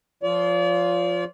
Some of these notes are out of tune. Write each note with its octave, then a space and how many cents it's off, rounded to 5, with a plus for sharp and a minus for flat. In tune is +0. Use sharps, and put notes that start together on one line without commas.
F3 +0 F4 +0 D5 -40